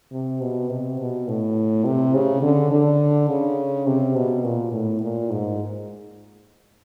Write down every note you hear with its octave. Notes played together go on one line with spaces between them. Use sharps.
C3
B2
C3
B2
A2
C3
C#3
D3
D3
C#3
C3
B2
A#2
A2
A#2
G#2